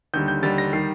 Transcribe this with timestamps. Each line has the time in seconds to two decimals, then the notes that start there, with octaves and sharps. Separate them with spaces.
0.14 D#2 D3 G3 G6
0.28 G6
0.43 D#2 D3 G3 A6
0.58 A#6
0.73 D#3 G3 C7